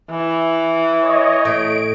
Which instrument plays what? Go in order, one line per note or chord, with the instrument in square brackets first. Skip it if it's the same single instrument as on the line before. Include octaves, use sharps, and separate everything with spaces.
[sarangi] E3
[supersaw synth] C#5 D#5
[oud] A2 [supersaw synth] D7